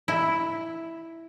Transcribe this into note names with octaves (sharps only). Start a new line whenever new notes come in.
E4